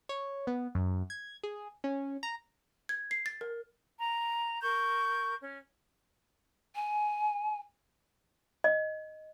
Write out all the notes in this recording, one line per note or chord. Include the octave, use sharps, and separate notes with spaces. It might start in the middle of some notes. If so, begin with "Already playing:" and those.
C#5
B3
F#2
G#6
G#4
C#4
A#5
G#6
C7
A6
A#4
A#5
A#4 C#6 G6
C#4
G#5
D#5